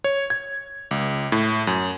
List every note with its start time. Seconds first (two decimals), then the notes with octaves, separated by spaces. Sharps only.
0.04 C#5
0.30 G#6
0.91 C#2
1.32 A2
1.67 F#2